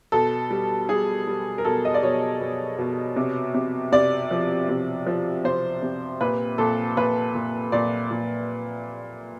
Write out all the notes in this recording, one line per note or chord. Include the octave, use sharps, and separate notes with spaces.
B2 A4
G3
G3 G#4
G3
A#4
B2 A4
D#5
D5
B2 C#5
B2
B2
C3
C3
C3 D5
F3
C3
F3
C3 C5
C3
A#2 B4
A#2 A4
A#2 B4
A#2
A#2 D5
A#2